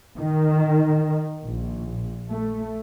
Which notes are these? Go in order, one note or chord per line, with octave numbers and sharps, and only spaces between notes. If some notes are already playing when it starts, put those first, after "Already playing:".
D#3
A#1
A3